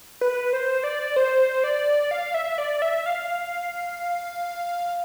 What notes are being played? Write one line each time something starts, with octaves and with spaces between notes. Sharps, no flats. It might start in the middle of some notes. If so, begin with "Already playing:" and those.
B4
C5
D5
C5
D5
F5
E5
D5
E5
F5